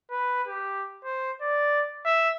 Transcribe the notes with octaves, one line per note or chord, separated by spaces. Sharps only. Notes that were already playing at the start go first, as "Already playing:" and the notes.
B4
G4
C5
D5
E5